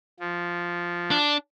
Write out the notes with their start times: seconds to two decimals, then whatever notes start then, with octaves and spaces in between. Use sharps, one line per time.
0.20 F3
1.11 D4